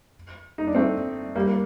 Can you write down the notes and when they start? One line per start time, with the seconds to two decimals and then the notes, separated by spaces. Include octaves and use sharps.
0.58 D#4
0.67 D4
0.75 A3 C4
1.36 G3 A#3
1.47 A#3